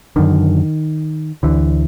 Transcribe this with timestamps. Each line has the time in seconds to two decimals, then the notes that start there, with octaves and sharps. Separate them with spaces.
0.16 F#2 D3 D#3
1.43 D2 D3 E3